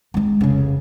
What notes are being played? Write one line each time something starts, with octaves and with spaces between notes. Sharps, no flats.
G#3 D#4
F1 C#3